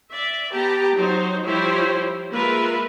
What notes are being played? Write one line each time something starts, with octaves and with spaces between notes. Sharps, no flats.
D5 E5
B3 G4 A5 A#5
F#3 D#4 C5
F3 G3 E4 G4 C5 C#5
G#3 A#3 F4 A#4 B4 E5